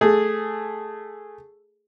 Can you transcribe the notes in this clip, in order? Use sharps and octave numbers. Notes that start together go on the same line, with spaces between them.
A3 G#4